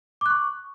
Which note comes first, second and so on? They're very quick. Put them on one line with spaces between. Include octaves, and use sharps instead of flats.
D6 F#6 C#6